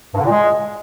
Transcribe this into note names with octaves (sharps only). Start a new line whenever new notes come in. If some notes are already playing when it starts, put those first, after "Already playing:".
G2
D3
A#2
G#3